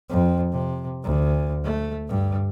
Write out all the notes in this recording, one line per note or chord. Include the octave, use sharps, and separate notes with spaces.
F2
C3
D2
A3
G2